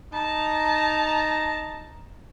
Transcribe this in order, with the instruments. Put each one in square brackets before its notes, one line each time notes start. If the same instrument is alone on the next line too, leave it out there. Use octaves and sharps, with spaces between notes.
[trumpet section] D#4 A#5 [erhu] A5